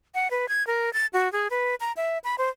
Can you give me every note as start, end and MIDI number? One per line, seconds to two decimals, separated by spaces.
0.15 0.30 78
0.31 0.48 71
0.49 0.66 92
0.67 0.92 70
0.93 1.07 93
1.13 1.31 66
1.32 1.48 68
1.51 1.75 71
1.80 1.92 82
1.97 2.18 76
2.24 2.35 83
2.38 2.49 72